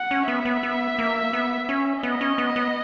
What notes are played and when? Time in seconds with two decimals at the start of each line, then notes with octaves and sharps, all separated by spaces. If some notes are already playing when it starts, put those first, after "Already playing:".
Already playing: F#5
0.11 C#4
0.28 B3 E5
0.45 B3
0.63 B3
0.99 A#3
1.33 B3
1.69 C#4
2.03 B3 D#5
2.21 C#4
2.38 B3
2.56 B3